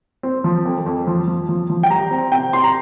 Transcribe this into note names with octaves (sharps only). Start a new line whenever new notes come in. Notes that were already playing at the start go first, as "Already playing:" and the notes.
C4
F3
F2
F2
F3
F3
F3
F3
G5
G3 A#5
C4
C3 G5
C3 C6
A#5